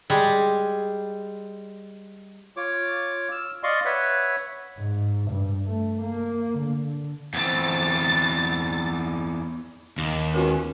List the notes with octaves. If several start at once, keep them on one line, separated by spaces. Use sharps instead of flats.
G3 G#3
F4 C#5 D6
E6 F6
D5 D#5 F5 C6 C#6
B4 C#5 E5 F#5
G#2
G2
A3
A#3
D3
E2 C4 A6
D#2
G#3 B3 C#4 F4 F#4 A#4